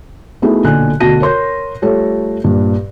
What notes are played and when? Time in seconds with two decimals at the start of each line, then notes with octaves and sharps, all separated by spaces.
0.42 A3 B3 D#4 E4 F#4 G#4
0.64 B1 A#2 D3 G#5 F#6
1.00 D2 B2 F#4 A5 A#6 D#7
1.21 A#4 C#5 C6 G6
1.82 G3 A3 F4 A4 C#5
2.44 G2 A#2